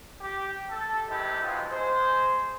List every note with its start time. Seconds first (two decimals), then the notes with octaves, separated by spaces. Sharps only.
0.21 G4
0.70 A4
1.08 C3 D#3 G#3 A3 E4 G4
1.42 G#2 F#3 G#3 B3 D#4 F4
1.70 G#3 C5